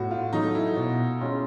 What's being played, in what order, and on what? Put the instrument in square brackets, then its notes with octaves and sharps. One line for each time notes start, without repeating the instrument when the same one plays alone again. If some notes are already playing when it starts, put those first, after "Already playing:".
Already playing: [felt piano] A2 [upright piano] F#4
[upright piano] F4
[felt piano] F#3 A3 [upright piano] D#4
[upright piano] E4
[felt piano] B2
G#3 C#4 F4